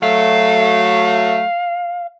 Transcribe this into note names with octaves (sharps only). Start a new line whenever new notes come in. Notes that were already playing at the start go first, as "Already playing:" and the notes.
F#3 A3 F5